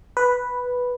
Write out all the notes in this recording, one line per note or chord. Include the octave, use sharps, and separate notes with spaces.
B4